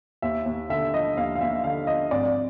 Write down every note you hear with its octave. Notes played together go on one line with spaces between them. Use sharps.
D#2 E5
D#2
D3 E5
F3 D#5
D#2 F5
F5
D#2 E5
D3 F5
F3 D#5
G#1 D5